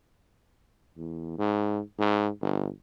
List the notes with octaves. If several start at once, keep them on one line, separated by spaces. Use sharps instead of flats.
E2
G#2
G#2
G1